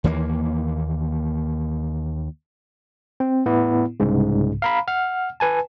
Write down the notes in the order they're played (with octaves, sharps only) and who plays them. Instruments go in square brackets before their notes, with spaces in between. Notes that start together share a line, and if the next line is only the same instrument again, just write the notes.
[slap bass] D#2 E3 G#3 A#3
[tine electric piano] C4
A2 B3 E4
C2 G#2 C#3
F5 A#5 B5
F#5 F6
B4 G#5 A5